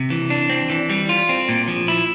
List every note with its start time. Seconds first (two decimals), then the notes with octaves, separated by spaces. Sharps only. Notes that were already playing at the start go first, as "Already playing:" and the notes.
Already playing: C3
0.10 E3
0.30 D4
0.49 C4
0.70 E3
0.90 G3
1.09 F4
1.29 C4
1.49 A#2
1.68 F3
1.88 E4